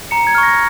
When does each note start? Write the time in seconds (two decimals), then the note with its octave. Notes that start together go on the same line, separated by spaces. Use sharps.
0.11 A#5 C#7
0.27 G#6
0.35 C#6 F6
0.43 A#6